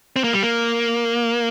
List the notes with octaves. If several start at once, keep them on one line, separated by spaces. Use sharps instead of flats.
C4
A#3
G3
A#3